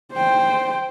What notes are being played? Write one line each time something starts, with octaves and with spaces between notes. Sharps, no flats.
C5 G5